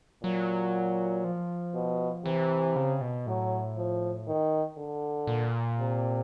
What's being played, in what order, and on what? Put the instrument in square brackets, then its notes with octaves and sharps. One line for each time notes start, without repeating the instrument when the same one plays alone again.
[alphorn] A#2 [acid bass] F#3
[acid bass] F3
[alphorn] B2
[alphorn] C3 [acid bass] E3
[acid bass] C#3
B2
[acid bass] A2 [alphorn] F#3
[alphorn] F3
D#3
D3
[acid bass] A#2
[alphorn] C3